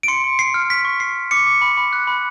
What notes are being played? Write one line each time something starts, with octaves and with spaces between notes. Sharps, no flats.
D7
C6 C#7
C6
C6 C7
F6
C#6 B6
C#6
C#6 C7
F6
D6 C#7
D6
B5
B5
F#6
B5